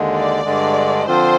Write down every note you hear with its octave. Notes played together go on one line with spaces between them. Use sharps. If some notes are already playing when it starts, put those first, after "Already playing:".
Already playing: D#2 D3 G#3
D5
G2 D3 G#3
D3 F3 C4 F4 C5